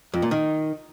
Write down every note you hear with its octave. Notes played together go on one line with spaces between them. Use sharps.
F2
A#2
D#3